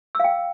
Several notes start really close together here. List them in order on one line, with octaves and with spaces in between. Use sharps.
E6 F5 G5